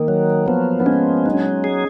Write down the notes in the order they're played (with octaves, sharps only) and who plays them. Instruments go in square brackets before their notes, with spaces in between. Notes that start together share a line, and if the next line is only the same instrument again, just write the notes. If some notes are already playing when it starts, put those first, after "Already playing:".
Already playing: [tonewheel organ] D#3 [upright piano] A#3
[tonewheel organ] F#3
[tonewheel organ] F3 [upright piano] B3
[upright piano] B3
[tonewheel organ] G#3 [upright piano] C#4
[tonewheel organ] F#3 [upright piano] D#4
[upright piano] C#4
D#4
[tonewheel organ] G#4